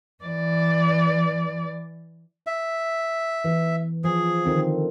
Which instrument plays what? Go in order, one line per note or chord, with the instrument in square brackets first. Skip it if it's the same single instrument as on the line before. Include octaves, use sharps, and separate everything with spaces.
[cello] E3 D5
[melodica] E5
[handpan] E3
[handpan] F3 [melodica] G#4
[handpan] D3 D#3 C4